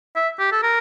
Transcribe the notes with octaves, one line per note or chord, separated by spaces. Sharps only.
E5
G4
A4
A#4